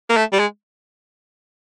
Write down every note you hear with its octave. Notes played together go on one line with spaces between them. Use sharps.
A#3
A3
G3
G#3